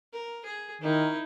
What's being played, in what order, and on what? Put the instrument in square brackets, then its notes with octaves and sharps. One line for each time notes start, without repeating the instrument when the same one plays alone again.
[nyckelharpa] A#4
G#4
[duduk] D#3 [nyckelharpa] D#4 E4